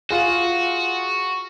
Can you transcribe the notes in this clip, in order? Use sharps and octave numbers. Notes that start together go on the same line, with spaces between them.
F4 F#4 G#4